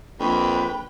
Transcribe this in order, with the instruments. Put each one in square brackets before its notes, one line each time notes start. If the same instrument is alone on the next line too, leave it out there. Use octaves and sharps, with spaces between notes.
[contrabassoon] A#1 [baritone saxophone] F2 [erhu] B4 [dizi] G5